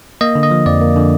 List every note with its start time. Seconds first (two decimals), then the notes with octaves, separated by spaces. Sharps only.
0.21 A#3 D#5
0.35 D3
0.43 D#5
0.51 F3
0.66 F2 D5
0.81 A#3
0.96 D3